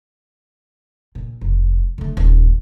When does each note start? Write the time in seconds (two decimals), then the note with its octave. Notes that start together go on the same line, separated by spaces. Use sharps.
1.15 A#2
1.41 F1
1.98 D3 A3
2.17 D#1